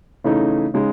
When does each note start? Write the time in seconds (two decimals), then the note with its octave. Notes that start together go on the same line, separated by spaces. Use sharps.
0.24 C#3 E3 A3 D#4
0.74 C#3 G#3 D#4